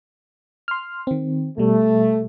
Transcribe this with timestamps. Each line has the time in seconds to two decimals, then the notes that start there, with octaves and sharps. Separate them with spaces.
0.68 C6 F6
1.07 D#3 C4
1.58 B2 G3 A3